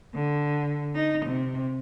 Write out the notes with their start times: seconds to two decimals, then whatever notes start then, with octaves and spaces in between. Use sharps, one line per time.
0.14 D3
0.95 D#4
1.26 C3